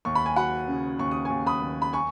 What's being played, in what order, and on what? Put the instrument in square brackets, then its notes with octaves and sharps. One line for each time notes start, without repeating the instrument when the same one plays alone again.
[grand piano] D#2 C#6
B5
G#5
F#3 F#5 B5
C#3
D#2 C#6
D#6
G#5 C#6
D#2
B5 D#6
D#2
B5
G#5 C#6